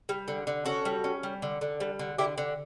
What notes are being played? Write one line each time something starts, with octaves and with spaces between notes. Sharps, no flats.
G3
D3
D3
C#4 F#4 A4
G3
C#4
G3
D3
D3
G3
D3
D3 E4 G4
D3